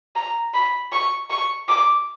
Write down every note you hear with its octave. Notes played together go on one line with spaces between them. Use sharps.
A#5
B5
C#6
C#6
D6